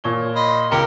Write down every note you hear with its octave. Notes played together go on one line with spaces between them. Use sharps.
A#2 C#5 G7
D#5 B5 C6
C#2 G4 A#4 A#5 C#7